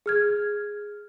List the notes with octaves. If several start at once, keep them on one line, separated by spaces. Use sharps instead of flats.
G#4 F6 G#6